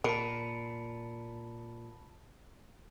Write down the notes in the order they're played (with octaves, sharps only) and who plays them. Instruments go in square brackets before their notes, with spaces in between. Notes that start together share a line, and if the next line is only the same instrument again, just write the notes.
[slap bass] A#2 [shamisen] A#4 [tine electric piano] A5 B5